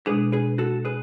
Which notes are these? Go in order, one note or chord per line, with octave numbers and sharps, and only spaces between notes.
B2 G#3 D4 G#4 B4
G#4 B4
F#4 A4
G#4 B4